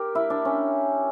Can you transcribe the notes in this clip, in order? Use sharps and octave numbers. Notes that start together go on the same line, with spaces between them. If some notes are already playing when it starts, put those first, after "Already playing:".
Already playing: G4 A#4
E4
D4
C#4